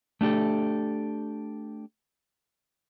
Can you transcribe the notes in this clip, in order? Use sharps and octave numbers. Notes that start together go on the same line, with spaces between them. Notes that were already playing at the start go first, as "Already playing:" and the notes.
A3 D4 G4 A4